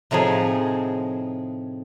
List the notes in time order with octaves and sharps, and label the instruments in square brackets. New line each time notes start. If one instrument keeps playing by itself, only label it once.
[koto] A2 C3 F3 D#4 G#4